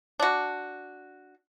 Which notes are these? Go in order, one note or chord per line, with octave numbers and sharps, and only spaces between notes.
D4 F#4